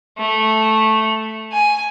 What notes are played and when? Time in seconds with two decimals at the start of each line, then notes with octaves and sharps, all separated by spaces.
0.18 A3
1.52 G#5